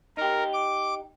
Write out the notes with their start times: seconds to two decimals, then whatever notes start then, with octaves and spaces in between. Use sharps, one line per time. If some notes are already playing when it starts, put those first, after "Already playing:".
0.17 D#4 G4 A#4
0.53 D6